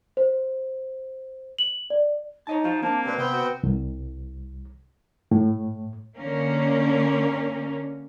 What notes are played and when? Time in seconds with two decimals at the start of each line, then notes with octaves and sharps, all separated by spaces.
0.17 C5
1.59 F#7
1.90 D5
2.47 D#4 C#5 D#5 A5
2.64 F3 F#4 F5
2.82 A#3 C4 D4 A5
3.05 B1 C4 D4 G4 B4
3.18 C3 B3 C4 G5
3.33 F#4
3.63 C2
5.31 A2
6.18 D3 A#3 C#4